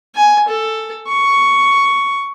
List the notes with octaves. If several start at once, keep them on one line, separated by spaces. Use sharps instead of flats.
G#5
A4
C#6